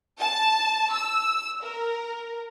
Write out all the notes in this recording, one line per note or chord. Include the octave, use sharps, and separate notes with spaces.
A5
E6
A#4